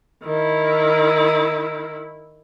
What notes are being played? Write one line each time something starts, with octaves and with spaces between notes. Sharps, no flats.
D#3 E4